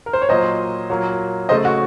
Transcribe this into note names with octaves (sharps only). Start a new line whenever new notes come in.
A#4
C5
C#5
A#2 F#3 A#3 C5 D#5
A#2 F#3 A#3
C#3 A3 C5 D#5
F#4